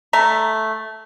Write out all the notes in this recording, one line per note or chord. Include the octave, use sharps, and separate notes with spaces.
A3 E5 A#5